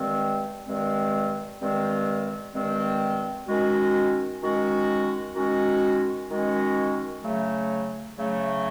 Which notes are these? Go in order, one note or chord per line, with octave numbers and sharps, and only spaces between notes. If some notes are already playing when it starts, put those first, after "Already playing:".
Already playing: G2 D#3 G#3 C4
G2 D#3 G#3 C4
G2 D#3 G#3 C4
G2 D#3 G#3 C4
D#3 G#3 C#4 F#4
D#3 G#3 C#4 F#4
D#3 G#3 C#4 F#4
D#3 G#3 C#4 F#4
C#3 F#3 A3
C#3 F#3 A3